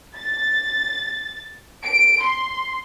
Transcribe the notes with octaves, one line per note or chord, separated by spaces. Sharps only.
A6
D7
C6